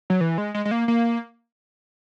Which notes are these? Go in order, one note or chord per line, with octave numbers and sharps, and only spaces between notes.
F#3
E3
G#3
G#3
G#3
A#3
A#3